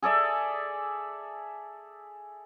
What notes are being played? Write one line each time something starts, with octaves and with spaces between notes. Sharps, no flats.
G#4 A4 D5 E5